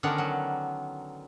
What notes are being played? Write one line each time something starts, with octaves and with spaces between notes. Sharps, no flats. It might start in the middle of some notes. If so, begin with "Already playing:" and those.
D3 D#3 B3 C#4 A#4 D5
F#3